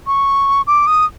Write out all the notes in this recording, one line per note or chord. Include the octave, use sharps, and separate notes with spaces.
C#6
D6
D#6